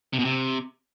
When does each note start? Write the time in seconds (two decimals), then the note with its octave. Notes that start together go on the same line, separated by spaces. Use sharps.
0.13 C3
0.19 B2
0.25 C3